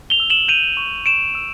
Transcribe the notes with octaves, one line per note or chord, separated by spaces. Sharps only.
F7 G7
E6
E7 F#7
G6 D#7 F7
C#6
C#6 D7 E7
E6